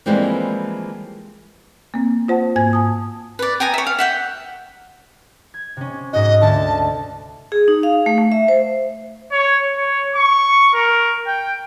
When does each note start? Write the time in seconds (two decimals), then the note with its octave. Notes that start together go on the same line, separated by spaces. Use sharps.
0.06 E3 F3 G3 G#3 A#3 C4
1.94 A#3 C4
2.28 F4 C5 F#5 A5
2.56 G#2 A#3 G#5 G#6
2.73 A5 D#6
3.39 B4 D5
3.60 G5 G#5 A#5 D#6
3.74 C#5 E5
3.87 F5
3.99 E5 F#5 G5
5.54 G#6
5.77 C3 C#4
6.13 G#2 F#4 D#5
6.41 D2 A5
7.52 G#4
7.68 D#4
7.83 F5
8.06 A3
8.18 A3
8.32 E5
8.48 C5
9.32 C#5
9.78 C#5
10.15 C#6
10.74 A#4
11.27 G5